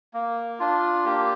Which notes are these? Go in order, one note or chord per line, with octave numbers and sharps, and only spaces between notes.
A#3
D4 F4
A#3 G4